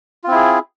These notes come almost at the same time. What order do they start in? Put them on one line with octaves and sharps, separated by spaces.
F4 C4 E4 G#4